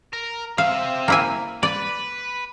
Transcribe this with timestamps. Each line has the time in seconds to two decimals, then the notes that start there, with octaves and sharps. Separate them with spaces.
0.13 A#4
0.58 C4 E5 F5
1.08 A#3 E4 G#5
1.63 B4 D5